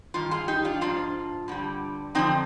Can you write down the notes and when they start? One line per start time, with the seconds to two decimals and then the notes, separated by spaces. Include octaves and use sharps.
0.14 G2 D#3 F4
0.31 F4 G#4
0.48 D#4 G4
0.65 D4 F4
0.81 G#2 F3 D4 F4
1.48 G2 D3 G3
2.15 F2 D3 F3 C4 D#4